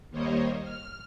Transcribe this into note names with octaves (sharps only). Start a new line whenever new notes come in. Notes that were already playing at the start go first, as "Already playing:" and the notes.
D#2 G3 A#3 C5 C#5 D#5
F6